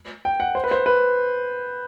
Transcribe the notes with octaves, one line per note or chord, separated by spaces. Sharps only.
G5
F#5
C5
B4
C5
B4